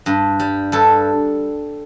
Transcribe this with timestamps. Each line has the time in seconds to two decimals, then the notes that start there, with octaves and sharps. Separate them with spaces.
0.06 G2
0.40 G3
0.72 G2 A4